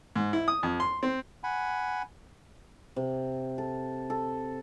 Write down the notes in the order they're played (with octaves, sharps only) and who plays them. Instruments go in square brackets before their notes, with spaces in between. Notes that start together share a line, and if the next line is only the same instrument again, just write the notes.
[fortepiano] G#2
E4
D#6
F2
C6
C4
[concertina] F#5 G#5 B5
[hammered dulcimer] C3
A4
A4